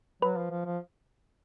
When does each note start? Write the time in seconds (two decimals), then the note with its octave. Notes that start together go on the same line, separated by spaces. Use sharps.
0.22 F#3 B4
0.37 F3
0.51 F3
0.65 F3